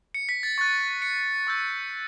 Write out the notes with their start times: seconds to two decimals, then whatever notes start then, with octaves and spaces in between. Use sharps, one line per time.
0.14 C#7
0.29 B6
0.43 A6
0.58 C#6 F#6 A6
1.02 C#7
1.47 C#6 E6 G6